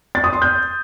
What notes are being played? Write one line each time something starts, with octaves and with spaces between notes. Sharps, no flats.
A6
D#6
C6
G6